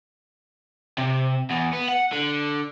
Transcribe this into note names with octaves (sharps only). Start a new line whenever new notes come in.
C3
E2
B3
F#5
D3